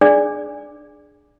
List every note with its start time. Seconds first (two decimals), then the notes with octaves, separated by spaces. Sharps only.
0.01 D4 G#4 D5